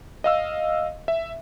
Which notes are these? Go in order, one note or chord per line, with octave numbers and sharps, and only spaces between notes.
D#5 F5 E6
E5